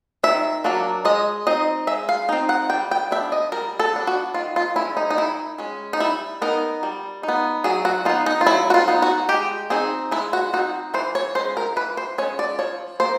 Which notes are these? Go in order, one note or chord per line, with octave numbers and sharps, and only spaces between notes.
D#3 E5
F#3 A#3 D4
G#3 D#5
C4 D#4 D#5
G#3 E5
F5
C4 D#4
F#5
G3 G5
G5
B3 D4 E5
D#5
G3 A#4
A4
B3 D4
F#4
D#3 F4
F4
G#3 C#4 E4
D#4
D#4
D#3 E4
G#3 C#4
D#4
G3 E4
B3 D#4 A#4
G3
D#4
B3
F#3 G#4
F#4
B3 D#4 F4
D#4
F4
F#3 E4
F#4
F4
B3 D#4
F#4
G#3 G4
C4 D#4 G#4
G#3 E4
F#4
C4 D#4 F#4
E3 C5
C#5
G#3 C#4 C5
A#4
E3 B4
C5
G#3 C#4 C#5
D5
F3 C#5
A#3 C5